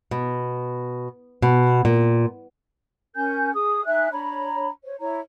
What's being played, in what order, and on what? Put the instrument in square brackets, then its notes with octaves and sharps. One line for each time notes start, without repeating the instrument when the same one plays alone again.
[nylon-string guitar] B2
B2
A#2
[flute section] C#4 A#4 G#5 G6
G#4 D#6
D#4 E5 G#5 F#6
D4 C#5 A#5 B5
C5 C#5
E4 C#5 A#5